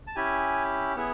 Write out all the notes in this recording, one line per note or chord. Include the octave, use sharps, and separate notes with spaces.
A5
C#4 E4 G4 G#5
B3 E4 G#4